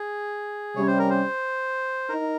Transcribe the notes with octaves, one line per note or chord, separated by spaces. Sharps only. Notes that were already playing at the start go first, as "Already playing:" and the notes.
Already playing: G#4
C3 G3 C#4 C#5
C5
A#4
C5
D#4 A#4